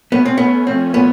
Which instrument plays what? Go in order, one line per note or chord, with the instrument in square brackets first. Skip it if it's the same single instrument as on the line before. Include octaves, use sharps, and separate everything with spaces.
[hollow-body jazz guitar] B3 [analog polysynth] C#4
[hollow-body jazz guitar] C4
[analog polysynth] A3 [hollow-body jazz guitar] B3
[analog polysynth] F3 [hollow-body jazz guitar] C4
[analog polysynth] A#2 [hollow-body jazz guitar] B3